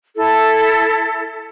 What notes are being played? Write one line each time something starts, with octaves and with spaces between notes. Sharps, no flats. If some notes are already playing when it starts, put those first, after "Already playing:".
E4 A4